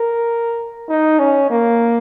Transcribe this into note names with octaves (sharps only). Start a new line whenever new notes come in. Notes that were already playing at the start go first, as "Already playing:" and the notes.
Already playing: A#4
D#4
C#4
A#3